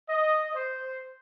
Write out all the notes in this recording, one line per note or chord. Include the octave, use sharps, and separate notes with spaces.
D#5
C5